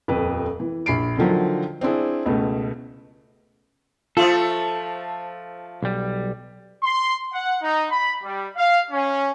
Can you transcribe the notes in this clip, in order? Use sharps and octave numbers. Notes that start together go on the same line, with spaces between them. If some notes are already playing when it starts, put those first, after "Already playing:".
D#1 F2 B4
E3
A#1 B5 C7 D7
D3 D#3 F3 F#3
C4 D4 E4 G#4
C#2 B2 A3
F3 A3 F4 A4
B1 G3
C6
F#5
D#4
B5
G3
F5
C#4